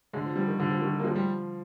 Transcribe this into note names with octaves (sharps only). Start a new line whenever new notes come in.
D3 G#3
F3
F3 G3
D#3
D3 F3
F3
D#3 G3
D#3
A#3
F3 G#3
G3